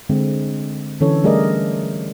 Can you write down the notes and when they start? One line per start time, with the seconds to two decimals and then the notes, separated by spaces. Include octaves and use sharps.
0.09 D3 G#3 C4
1.00 D3 E3 C#4 A4 C#5
1.24 G3 A3 G#4 A#4 D5 D#5